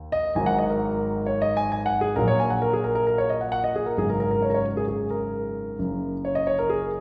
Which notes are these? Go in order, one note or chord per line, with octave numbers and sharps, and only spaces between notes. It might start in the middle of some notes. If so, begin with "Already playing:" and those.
Already playing: D#2
D#5
G#1 G#2 D#3 F#3 G#5
F#5
D#5
A#4
C#5
D#5
G#5
G#5
F#5
G#4
A#1 A#2 F#3 A#4
C#5
G#5
F#5
A#4
G#4
A#4
A#4
A#4
C#5
D#5
F#5
F#5
D#5
G#4
A#4
G#1 F#2 C#3 F#3 G#4
A#4
A#4
A#4
C#5
A#4
C#5
G#4
G#4
A#4
F#1 F#2 C#3
C#5
D#5
C#5
A#4
G#4